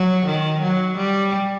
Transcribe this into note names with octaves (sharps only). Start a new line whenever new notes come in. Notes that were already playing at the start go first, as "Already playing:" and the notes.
Already playing: F#3
D#3
F#3
G3